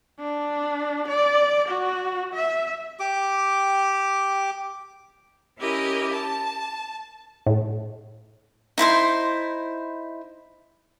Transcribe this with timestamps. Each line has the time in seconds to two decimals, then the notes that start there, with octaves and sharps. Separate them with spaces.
0.19 D4
1.08 D5
1.68 F#4
2.34 E5
3.00 G4 D6
5.58 C#4 E4 G4 A#4 D#5
6.12 A5
7.47 A2
8.78 D#4 E4 C5 C6